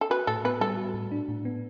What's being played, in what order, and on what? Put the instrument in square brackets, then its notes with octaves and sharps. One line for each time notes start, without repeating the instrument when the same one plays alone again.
[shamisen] A4
[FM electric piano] F#4 [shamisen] B4
[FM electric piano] A2 [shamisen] A4
[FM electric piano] B3 [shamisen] B4
[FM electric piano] G3 [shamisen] A4
[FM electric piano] F#4
A2
D4
A2
B3